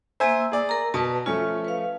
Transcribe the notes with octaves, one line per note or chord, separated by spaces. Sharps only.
A#3 C5 E5 G#5 A#5 E6
G#4 D5
A#4 A#5
B2 B4 A5
F3 A3 C#4 F4 C#6
B4 F5